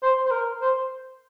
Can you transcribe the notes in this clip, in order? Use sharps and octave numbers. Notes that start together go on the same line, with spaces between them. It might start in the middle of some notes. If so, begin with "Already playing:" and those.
C5
C5
A#4
C5